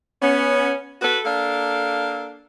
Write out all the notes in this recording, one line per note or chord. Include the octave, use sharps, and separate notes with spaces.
B3 C#4
F#4 A4 B4
A#3 D4 A4 F5